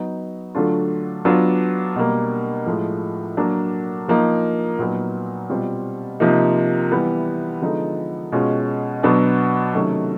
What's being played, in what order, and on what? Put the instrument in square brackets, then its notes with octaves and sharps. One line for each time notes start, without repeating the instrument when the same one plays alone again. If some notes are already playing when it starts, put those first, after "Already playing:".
Already playing: [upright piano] F#3 B3 D#4
D3 F#3 A3 D4 F4
F#3 B3 D4 F4
B2 G3 A#3
A2 F3 G#3
F#3 A#3 D4
F3 A#3 D#4
A#2 F#3 B3 D#4
B2 G3 C4 F4
C3 F3 A#3 D#4
E3 G3 B3
D3 F3 G#3 B3 D#4
B2 G#3 C#4 F4
B2 F#3 B3 D4
C3 D#3 F#3 A3 C#4